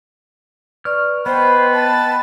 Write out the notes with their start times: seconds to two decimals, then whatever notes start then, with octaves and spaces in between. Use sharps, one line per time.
0.85 B4 D5 C#6 F6
1.26 B3 B4 C5 D#5 F#5 G5
1.73 A5